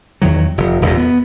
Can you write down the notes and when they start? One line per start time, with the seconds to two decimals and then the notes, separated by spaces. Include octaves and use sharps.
0.22 E2 D#3 F#3
0.58 F1
0.82 D#1 E2 G2
0.97 B3